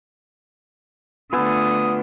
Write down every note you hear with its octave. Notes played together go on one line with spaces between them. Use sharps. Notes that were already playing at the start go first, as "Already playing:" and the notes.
D3 A3 B3 F4 G#5 D#6 E6